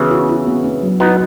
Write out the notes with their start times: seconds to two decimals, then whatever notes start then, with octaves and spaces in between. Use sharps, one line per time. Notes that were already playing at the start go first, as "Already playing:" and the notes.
Already playing: C#3 E3 B3 F#4
0.11 F#4
0.29 F#4
0.47 B3
0.64 B3
0.82 F#3
1.00 B3 D#4 F#4